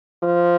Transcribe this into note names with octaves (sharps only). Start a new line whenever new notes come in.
F3